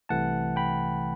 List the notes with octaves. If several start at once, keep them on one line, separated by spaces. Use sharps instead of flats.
C2 C3 E3 A3 F#5 A5
G5 B5